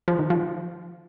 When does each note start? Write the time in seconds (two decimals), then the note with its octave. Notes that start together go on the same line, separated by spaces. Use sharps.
0.08 F3
0.19 D#3
0.30 F3